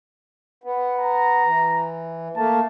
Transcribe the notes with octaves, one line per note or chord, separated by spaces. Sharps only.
B3
A#5
E3
A3 A#3 A5